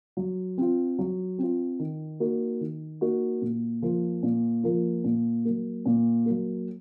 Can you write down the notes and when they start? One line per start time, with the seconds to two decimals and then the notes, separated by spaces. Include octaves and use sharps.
0.17 F#3
0.58 C4 F4
0.99 F#3
1.38 C4 F4
1.79 D#3
2.20 A#3 D#4 F#4
2.61 D#3
3.01 A#3 D#4 F#4
3.42 A#2
3.82 F3 A#3 F4
4.23 A#2
4.63 F3 A#3 F4
5.04 A#2
5.45 F#3 A#3
5.86 A#2
6.26 F#3 A#3